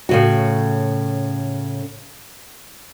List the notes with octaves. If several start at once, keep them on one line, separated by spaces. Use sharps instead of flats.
A2 C#3 F#4